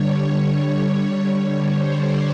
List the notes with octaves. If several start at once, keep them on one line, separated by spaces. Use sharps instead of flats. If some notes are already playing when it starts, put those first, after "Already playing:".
Already playing: D3 G3 C#5
C#5
C5
D5